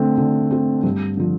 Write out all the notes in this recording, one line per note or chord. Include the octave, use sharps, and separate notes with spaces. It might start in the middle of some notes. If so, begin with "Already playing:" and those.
Already playing: D3 A3 C4
D3
A3 C4
G2
D3 F3